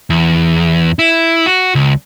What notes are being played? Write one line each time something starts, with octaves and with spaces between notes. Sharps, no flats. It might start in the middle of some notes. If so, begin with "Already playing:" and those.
E2
E4
F#4
C#2